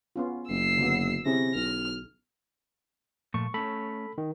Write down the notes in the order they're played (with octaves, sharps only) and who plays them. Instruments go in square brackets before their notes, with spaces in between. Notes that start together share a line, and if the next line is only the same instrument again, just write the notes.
[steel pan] B3 C#4 F4
[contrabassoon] F#1 [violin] E6 C7
[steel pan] D3 F#3 B3
[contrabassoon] C3 [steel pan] C#4 E4 G#4 [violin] A#6
[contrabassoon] B1 [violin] F6
[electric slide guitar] A#2 F3 A3 [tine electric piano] C#6
[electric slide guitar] A3 C#4 [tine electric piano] A4 B5
[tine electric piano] D#3